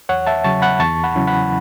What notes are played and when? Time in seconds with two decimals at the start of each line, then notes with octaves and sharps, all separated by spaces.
0.09 E2 C#5 F#5
0.27 E5 A5
0.44 C#3 F#3 A5 C#6
0.62 F#5 B5
0.80 E2 A5 C#6
1.04 F#5 B5
1.15 C#3 F#3 C#4 E4
1.27 F#5 B5